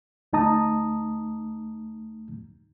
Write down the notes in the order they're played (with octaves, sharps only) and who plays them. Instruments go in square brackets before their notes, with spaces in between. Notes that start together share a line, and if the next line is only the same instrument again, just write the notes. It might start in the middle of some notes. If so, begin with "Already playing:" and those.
[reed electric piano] D2 A3 D#4 A5 A#5 D#6